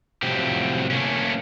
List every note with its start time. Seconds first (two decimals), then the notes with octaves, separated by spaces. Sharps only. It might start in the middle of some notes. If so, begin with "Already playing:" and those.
0.22 A2 C3 F3 F#3 G4
0.90 A3 A#3 C#4